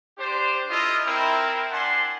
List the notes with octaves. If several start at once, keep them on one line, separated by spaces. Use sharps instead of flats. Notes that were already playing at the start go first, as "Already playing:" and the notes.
D4 G4 C5
E4 F4 A4 D#5
C4 E4 A#4
D4 F#5 G#5 A5 B5 C6